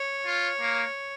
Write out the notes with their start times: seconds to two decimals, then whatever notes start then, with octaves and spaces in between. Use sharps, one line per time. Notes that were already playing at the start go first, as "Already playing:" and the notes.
Already playing: C#5
0.26 F4
0.60 A#3